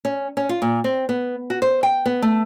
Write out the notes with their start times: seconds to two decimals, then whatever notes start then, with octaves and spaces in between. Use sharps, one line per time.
0.05 C#4
0.37 C#4
0.49 F4
0.62 A#2
0.84 C4
1.09 B3
1.50 F#4
1.62 C5
1.83 G5
2.06 B3
2.22 A3